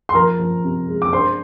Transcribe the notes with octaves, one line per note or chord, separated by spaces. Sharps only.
C6
F3 A#4 A#5
F3
C3
G#3
D6
D4 C5 C6